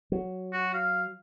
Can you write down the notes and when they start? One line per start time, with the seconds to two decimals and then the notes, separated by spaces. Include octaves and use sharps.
0.12 F#3
0.53 F#4
0.74 F5